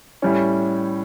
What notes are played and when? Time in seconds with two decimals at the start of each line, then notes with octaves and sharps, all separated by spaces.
0.22 A2 G3 C#4